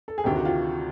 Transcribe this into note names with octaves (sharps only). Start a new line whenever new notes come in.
A4
G#4
D2 C3 D#3 G4
F#4
F4